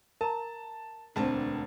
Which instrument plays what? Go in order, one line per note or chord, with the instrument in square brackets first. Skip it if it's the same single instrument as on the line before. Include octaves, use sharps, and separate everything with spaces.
[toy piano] A#4 A#5 [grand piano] A5
[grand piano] E1 A5 [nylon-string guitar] D2 C4 B4 [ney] D4